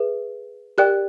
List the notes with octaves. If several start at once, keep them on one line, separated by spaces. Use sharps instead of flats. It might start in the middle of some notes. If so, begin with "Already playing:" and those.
Already playing: G#4 B4 E5
G4 A#4 D5 G5 F#6